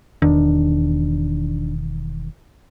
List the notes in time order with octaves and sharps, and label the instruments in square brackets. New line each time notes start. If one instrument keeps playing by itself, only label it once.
[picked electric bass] E1 E2 D#3 [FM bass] D4